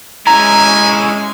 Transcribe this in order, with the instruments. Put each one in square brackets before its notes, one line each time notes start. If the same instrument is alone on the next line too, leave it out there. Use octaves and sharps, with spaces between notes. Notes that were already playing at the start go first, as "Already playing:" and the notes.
[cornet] G#3 [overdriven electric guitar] C#4 E4 [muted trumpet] G#5 [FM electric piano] A#5